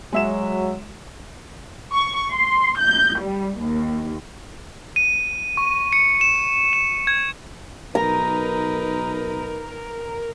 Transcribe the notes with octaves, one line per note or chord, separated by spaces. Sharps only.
F#3 G#3 E5 E7
C#6
C6
G6
G3
D#2
D#7
C#6
C#7
E7
E7
G#6
B1 D#4 A#4 B4 A#5